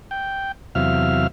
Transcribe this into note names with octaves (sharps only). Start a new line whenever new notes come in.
G5
E2 C3 F#3 E5 F5 F6